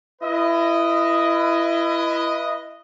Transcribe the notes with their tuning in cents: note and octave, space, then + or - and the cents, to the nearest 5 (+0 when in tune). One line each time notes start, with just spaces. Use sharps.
E4 +25 B4 -10 D#5 +0